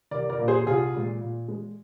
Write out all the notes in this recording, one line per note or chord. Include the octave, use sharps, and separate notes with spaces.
C2 A#4 D5
A#4 D5
A#2 G3 A#3
G#4 C5
C2 F4 G#4
A#2 G#3
A#2
G#3